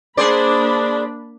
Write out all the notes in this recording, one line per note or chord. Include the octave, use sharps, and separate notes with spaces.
A#3 D4 G#4 C5 D5 B5